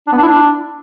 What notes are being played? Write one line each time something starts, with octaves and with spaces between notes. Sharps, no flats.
D4
B3
D4
E4
D4